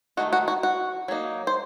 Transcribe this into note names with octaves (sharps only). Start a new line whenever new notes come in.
D#3 A3 D#4 F#4
F#4
F#4
F#4
F#3 A#3 D#4
C5